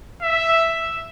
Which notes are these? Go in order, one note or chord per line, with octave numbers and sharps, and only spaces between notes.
E5